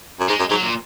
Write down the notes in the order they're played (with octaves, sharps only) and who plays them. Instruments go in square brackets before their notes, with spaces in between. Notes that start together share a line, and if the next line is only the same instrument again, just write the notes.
[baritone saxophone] F#2
[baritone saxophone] G#2 [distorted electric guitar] G#3
[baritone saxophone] F#2
[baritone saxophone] G#2 [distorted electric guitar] F#3
[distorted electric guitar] A#2